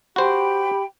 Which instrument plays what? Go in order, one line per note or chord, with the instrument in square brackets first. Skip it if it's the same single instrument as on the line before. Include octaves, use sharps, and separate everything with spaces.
[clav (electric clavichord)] F#4 C5 [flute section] G4 G5 B5